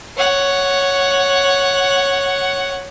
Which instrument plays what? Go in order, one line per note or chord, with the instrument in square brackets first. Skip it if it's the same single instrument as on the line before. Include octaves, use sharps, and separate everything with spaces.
[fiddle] C#5 F#5